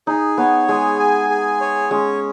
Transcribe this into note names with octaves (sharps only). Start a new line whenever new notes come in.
D#4 G#4
B3 C#5
G#3 G#4
G#5
G#4
C#5
G#3 C#4